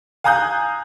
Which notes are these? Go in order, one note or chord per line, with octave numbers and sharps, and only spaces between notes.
F5 G#5 A#5 D#6 F#6 G6